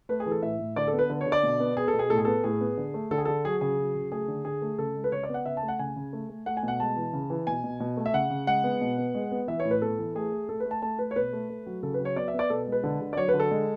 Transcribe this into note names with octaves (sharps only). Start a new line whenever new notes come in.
A3 B4
G#4
E3
A4
A2 E5
A2
D3 D5
A4
B3
B4
D3
C#5
D3
D5
B2
B3
B3 G#4
A4
B2
G#4
A2 A4
G#4
B3 A4
A2 G#4
B3
D3
A3
D3 A4
G#4
D3 A4
F#3 G#4
C#3 G#4
F#3
C#3
A3 G#4
D3
D3 G#4
A3
C#3 A4
G#3
B4
C#3 C#5
D5
B3
F#5
C#3 E5
A5
A3
F#5
C#3 G#5
C#3
A3
A3
A3 F#5
G#5
B2 F#5
G#3 A5
E3
C#3
E3
B2 G#5
B2
B2
A3
E5
C#3 F#5
C#3
G#3 F#5
B3
B2
B3
G#3
B3
E3 E5
C#5
A2
B4
B3 A4
E3
A3 G#4
A3
A3 A4
B4
A3
A5
A3 A5
A3 B4
C#5
B2 B4
A3
A3
F#3
C#3 A4
B4
F#3
C#5
B3 D5
E5
B3
D5
B2 A4
G#3
B4
D3
D3
D5
F#3 C#5
B4
D3
A4
G#3